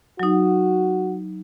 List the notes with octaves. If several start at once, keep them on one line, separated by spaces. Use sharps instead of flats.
F#3 D#4 F#4